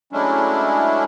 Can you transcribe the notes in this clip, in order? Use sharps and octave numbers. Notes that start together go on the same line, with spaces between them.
F#3 G#3 A3 C#4 D4 E4